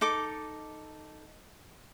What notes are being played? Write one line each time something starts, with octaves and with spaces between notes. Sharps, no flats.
D#4 A4 D6